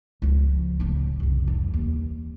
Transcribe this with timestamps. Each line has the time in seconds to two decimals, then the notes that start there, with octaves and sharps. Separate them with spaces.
0.22 C#2 F3
0.80 A2 C#3
1.20 C2 F2
1.47 E3 G3
1.74 D#2